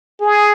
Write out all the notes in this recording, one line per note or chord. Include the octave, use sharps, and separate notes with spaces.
G#4